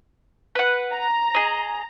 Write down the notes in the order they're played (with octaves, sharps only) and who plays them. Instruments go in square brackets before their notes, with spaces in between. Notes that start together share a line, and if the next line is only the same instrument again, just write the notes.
[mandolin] B4 F#5
[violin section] A#5
[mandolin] G#4 D#5